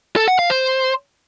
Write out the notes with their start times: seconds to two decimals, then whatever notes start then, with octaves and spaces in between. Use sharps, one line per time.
0.16 A4
0.28 F#5
0.39 F5
0.50 C5